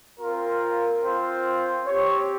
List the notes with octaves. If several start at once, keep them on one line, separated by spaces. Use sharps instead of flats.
C4 F4 A#4
C4 F4 C5
C4 G4 C#5